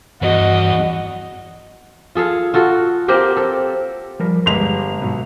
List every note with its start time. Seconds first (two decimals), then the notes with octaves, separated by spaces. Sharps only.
0.22 E2 G2 F#4 D#5
2.15 F4 G#4 A4 F5
2.54 F4 F#4 A4
3.08 A#3 C4 G4 A#4
3.37 A4
4.20 F3 G3 A#4
4.46 G1 G#3 G4 C6 F7
5.00 G#2 B2 F#3